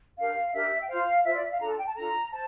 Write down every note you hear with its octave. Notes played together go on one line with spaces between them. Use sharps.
D4 G4 A#4 F5
D4 G4 A#4 E5
G5
F4 C5 F5
F4 C5 E5
D5
E5
F5
D4 F4 A4 A#5
A5
G5
A5
D4 F4 A4 A#5
C5 A5